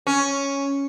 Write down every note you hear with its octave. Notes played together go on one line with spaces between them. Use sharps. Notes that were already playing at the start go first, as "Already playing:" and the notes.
C#4